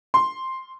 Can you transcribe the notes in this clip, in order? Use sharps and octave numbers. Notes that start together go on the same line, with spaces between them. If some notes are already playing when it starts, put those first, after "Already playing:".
C6